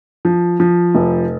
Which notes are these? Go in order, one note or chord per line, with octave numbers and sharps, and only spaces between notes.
F3
F3
F1